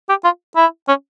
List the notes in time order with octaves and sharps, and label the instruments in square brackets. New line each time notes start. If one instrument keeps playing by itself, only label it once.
[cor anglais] G4
F4
E4
C#4